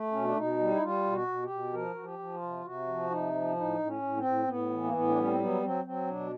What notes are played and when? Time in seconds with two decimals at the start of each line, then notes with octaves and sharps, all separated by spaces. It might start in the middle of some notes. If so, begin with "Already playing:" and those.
Already playing: A3
0.12 B2 C#4
0.24 D4
0.36 B2 D#4
0.59 G3
0.70 E4
0.82 G3 F4
1.05 B2
1.12 F#4
1.27 B2
1.43 G4
1.50 B2
1.73 F3 A#4
1.94 F3 F#4
2.03 G4
2.19 F3
2.34 F4
2.42 C3
2.64 C3 F#4
2.87 F3
3.10 C3 D#4
3.33 F3
3.56 A2 D#4
3.79 A2
3.87 C#4
4.02 A2
4.17 C4
4.24 A2
4.47 A2 B3
4.70 E3
4.84 A#3
4.93 A2 B3
5.08 D4
5.16 G3 C#4
5.29 C4
5.39 F#3 B3
5.62 F#3 C4
5.85 F#3 C4
6.07 B2 D4